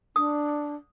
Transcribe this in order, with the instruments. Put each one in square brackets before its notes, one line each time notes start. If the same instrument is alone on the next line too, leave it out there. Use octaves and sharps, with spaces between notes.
[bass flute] D4 [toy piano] D#6